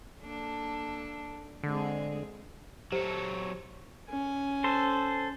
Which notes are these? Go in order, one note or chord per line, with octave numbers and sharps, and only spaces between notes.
A#3 D4 A4
D3 G#3 C4 G#4
F#3 G4 A4 C5
C#4 G#5
A4 C5